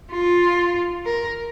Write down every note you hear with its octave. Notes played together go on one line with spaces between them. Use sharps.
F4
A#4